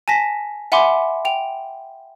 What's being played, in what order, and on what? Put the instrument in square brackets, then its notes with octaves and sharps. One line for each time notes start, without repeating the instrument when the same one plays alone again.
[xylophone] G#5 A5 A#6 B6
E5 F#5 G#5 B5 C6 D6
G5 F7